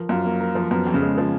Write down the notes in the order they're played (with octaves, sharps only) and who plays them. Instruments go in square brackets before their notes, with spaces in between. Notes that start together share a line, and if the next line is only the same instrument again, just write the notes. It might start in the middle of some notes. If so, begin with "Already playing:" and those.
Already playing: [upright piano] F3 A#4
[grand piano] F#2 [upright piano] F4
[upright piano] A#3
A#4
F3
[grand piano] F#2 [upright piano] B3
[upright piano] F2
[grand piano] C#3
[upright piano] G#3
F3